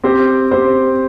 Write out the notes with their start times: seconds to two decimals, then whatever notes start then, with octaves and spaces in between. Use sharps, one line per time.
0.04 C4 G4 C5
0.51 C4 G4 C5